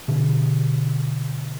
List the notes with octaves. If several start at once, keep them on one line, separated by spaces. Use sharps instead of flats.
B2 D3